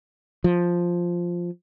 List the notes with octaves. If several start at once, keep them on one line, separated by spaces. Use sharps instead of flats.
F3